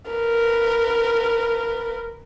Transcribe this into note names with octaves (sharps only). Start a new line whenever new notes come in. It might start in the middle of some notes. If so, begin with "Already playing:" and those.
A#4 B4